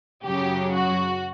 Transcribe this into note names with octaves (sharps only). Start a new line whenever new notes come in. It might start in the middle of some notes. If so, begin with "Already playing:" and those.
F#2 C#3 F#3 G4
F#4